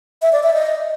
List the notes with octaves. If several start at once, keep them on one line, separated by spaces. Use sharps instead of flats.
E5
D5
E5
D#5